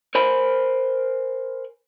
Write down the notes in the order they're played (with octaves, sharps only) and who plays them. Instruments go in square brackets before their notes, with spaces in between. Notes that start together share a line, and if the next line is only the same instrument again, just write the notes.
[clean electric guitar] A#4 C5 G#5 B5